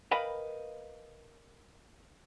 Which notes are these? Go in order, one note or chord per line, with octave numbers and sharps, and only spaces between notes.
A#4 B4 D#5 F5 G5 B5